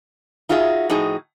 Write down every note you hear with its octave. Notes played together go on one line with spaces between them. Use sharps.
D#4 F4 F#4 G#4 C#5 E5
A2 F3 D#4 F#4 G#4